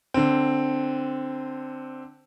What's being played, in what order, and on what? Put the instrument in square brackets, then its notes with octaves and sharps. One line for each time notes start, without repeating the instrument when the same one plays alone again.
[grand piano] D3 C4